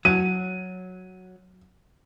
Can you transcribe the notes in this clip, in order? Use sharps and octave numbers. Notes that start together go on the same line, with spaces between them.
F#3 D#7